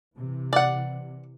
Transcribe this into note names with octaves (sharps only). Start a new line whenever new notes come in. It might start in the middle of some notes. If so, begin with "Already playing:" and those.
C3 E3
D5 F#5